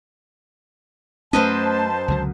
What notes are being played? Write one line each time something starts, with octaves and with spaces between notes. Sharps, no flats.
F#2 A3 B3 C#4 B4 C5 D#5 A5
C#2 D3 F#3